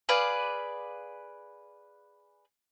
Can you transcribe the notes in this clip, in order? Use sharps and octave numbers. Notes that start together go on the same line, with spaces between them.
G#4 B4 D5 F5